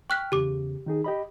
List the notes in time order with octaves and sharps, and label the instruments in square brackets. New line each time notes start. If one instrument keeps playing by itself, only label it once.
[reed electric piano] G5 F6 [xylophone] C#6 F#6 B6
[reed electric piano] E2 C#3 [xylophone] G4 D6
[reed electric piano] D#3 D#4 G#4
G4 D#5 B5